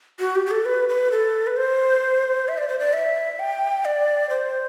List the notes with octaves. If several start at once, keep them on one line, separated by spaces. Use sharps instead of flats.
F#4
G4
G4
A4
B4
B4
A4
B4
C5
E5
D5
C5
D5
E5
G5
D5
C5